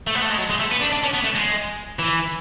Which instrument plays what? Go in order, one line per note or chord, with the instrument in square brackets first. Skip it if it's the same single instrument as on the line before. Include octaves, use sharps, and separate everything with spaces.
[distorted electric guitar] A3
B3
A3
G#3
F#3
G#3
A3
B3
D4
D4
C#4
B3
A3
G#3
E3